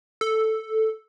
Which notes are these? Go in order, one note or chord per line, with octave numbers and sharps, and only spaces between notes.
A4